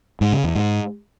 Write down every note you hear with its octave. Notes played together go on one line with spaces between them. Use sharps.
G#2
C#3
E2
G#2